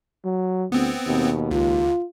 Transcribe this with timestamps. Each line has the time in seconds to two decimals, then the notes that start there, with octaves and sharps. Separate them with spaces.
0.25 F#3
0.72 D2 B3 C4
1.07 D#2 B2
1.51 C#2 F4